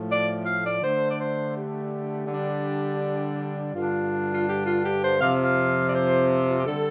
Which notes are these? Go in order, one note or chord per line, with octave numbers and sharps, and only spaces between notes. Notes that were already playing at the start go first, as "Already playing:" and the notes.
Already playing: A2 F3 A3
D5
F5
D5
D3 A3 D4 C5
D5
C5
G4
D3 G3 D4
G2 D3 G3 D4 F4
F4
G4
F4
G4
C5
F2 C3 F3 C4 F5
F5
D5
C5
F4
G4
D3 G3 D4 A4